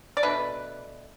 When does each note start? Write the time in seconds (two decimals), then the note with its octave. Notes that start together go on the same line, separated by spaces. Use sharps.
0.17 D5
0.23 B2 A3 D4 B4